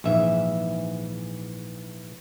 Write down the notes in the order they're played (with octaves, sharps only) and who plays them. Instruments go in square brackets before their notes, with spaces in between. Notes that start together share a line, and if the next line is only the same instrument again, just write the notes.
[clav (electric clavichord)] A#1 G#2 [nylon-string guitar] E3 E5